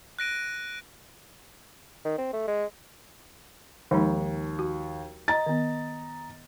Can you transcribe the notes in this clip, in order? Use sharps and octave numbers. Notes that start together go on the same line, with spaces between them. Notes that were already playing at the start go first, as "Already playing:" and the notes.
F#6 A#6 D7 D#7
D#3
C4
A3
G#3
D#2 F3 G#3 D#4
F#4
D#5 A#5 A6
D#3 B3